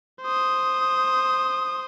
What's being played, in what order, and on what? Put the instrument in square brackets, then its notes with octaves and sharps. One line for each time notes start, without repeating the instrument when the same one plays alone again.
[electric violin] C5 D#6